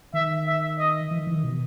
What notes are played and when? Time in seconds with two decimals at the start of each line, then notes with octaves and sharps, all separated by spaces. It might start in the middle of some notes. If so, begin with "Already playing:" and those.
0.13 D#3 E5
0.47 E5
0.79 D#5
1.11 E3
1.19 D#3
1.27 E3
1.36 D#3
1.44 B2